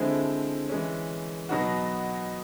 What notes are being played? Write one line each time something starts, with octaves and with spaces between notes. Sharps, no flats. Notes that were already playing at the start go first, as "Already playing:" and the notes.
Already playing: D3 F3 G#3 C4 E4
E3 G#3 C#4
B2 F#3 B3 D#4 F#4